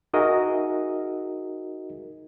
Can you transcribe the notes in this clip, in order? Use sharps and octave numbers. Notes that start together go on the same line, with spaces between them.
D#4 F#4 G#4 A#4 D#5 E5